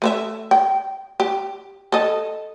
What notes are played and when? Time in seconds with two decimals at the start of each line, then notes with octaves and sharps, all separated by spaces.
0.02 A3 B4 E5
0.51 G5
1.20 G4
1.92 A4 D#5